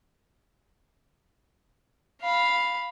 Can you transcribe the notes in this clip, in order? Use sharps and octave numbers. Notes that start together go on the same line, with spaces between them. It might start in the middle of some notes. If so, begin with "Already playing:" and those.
F5 B5